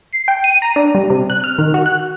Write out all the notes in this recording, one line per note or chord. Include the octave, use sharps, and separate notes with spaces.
C7
G5
D#7
A#5
D4
G3
C3
F#6
F6
D#3
F#4
F#6